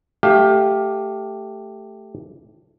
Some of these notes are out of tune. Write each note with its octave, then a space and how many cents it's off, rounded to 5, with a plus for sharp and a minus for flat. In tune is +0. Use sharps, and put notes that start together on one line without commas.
A3 +0 G4 +0 F5 +20